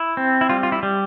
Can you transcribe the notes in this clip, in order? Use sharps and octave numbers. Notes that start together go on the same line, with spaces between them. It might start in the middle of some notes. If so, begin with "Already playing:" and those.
Already playing: E4
C4
E4
G3 F4
F4
E4
G3